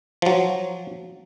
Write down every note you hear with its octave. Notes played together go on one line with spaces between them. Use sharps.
F3 F#3